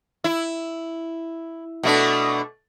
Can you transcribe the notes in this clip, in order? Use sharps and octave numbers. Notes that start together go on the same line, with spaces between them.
E4
B2 A3 D4